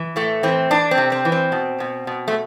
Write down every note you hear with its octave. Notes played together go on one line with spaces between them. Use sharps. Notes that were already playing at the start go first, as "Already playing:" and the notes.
Already playing: E3
A2 A3
E3 C4
E3 D4
C4
C3
C4
E3
C4
B2
B2
B2
A3